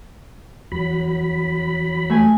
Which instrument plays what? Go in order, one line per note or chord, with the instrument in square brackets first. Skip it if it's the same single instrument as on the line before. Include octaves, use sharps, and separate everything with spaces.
[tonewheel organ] E2 F#3 B5
[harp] A3 G#5